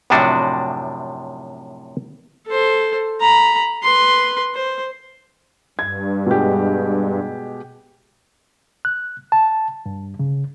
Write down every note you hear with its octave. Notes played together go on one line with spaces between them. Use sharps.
F#2 A2 C3 F3 D4 F#4
A4 C5
A#5 B5
B4 C6
C5
G2 G#6
B2 G#3 G4
F#6
A5
G2
C#3